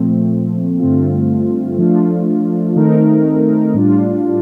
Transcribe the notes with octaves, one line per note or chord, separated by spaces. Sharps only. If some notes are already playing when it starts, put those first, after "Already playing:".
Already playing: A#2 F3 A3 C4
G2 D3 A3 C4 F4
F3 A3 D4 F4
D#3 A3 C4 D#4 A#4
A2 G3 D4 F4